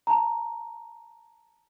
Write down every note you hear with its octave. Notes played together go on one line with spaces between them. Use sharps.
A5 A#5